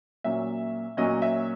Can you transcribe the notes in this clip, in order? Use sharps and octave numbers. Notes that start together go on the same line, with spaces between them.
A#2 F#3 C#4 E5
A#2 F#3 C#4 D#5
E5